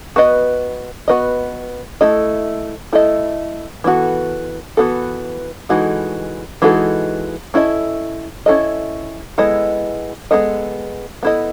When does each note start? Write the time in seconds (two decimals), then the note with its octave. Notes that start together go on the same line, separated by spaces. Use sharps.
0.16 B3 F#4 B4 D#5
1.08 B3 F#4 B4 D#5
2.01 A3 E4 A4 D#5
2.93 A3 E4 A4 D#5
3.84 E3 B3 F#4 A4
4.77 E3 B3 F#4 A4
5.69 E3 G#3 D#4 F#4 A4
6.62 E3 G#3 D#4 F#4 A4
7.54 C#4 E4 A4 D#5
8.46 C#4 E4 A4 D#5
9.38 G#3 B3 E4 A4 D#5
10.31 G#3 B3 E4 A4 D#5
11.23 B3 E4 A4 D#5